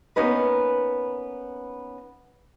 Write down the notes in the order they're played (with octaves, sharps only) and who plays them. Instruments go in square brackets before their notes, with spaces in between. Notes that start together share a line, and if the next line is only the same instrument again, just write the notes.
[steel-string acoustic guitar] A#3 B3 C#4 D#4 B4